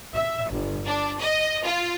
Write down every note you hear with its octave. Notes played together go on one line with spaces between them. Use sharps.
E5
G1
D4
D#5
F4